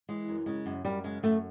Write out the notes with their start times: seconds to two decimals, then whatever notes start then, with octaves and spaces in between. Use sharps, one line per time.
0.09 E3 G#3
0.28 F#2
0.46 C#3 G#3
0.66 F#2
0.85 F#2 G3
1.04 C#3 G#3
1.23 F#2 A3